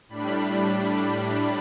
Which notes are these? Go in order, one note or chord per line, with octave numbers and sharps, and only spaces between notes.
A2 G3 D4 B5